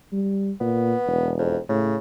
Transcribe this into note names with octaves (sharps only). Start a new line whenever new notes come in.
G3
A#2 B3
E1
F2
A2 C#3